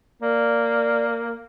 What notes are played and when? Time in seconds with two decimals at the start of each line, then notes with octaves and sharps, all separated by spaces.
0.22 A#3 D5